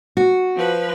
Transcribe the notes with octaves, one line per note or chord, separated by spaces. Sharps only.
F#4
F3 B4